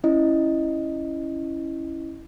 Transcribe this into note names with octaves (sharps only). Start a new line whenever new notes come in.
C#4 E4 D#5